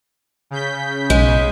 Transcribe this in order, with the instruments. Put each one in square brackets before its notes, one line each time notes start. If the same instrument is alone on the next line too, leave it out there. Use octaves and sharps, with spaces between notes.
[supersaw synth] C#3 G6 B6
[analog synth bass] B1 [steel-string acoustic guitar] G#3